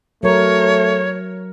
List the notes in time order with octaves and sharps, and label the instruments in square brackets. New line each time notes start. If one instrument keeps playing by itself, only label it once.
[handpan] F#3 A#4 [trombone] A3 [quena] C#5